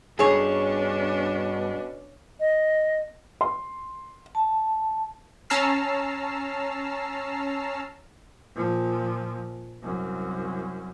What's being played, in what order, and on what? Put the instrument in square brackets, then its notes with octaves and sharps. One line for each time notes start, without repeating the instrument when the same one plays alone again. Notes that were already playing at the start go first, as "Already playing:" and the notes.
[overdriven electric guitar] G2 [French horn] B2 [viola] C#4 D4 [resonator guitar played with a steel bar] G#4 C#5
[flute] D#5
[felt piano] C6
[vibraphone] A5
[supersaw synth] C#4 A5 A#5 E6 F6 C7
[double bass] A#2 F3
C2 F#2